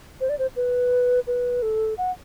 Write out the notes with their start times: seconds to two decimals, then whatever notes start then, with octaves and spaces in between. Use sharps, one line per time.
0.21 C5
0.29 D5
0.39 C5
0.56 B4
1.27 B4
1.62 A4
1.98 F#5